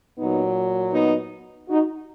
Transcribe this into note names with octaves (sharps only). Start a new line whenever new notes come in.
A#2 F#3 B3 D#4
B3 D#4
D#4 F#4